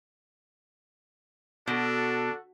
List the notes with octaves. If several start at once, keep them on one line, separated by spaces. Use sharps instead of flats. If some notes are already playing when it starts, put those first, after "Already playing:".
B2 D4 F#4 A4